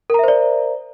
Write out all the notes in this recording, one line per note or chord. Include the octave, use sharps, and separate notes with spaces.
A#4 C5 D5 E5 A#5